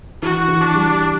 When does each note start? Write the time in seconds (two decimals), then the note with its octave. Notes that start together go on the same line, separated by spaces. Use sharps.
0.22 E3 F#4
0.48 E3
0.61 D4
0.74 G3